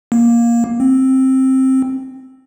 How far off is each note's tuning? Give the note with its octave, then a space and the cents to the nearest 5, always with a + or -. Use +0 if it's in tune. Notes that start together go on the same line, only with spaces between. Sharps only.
A#3 +10
C4 +10